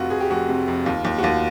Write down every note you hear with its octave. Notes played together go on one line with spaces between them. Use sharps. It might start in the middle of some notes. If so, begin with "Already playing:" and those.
Already playing: F1 C3 F4 F#4
F1 G#4
G4
F2 F#4
C3
F2
D#2 F4
D#2 F4
F#4
D#2 F4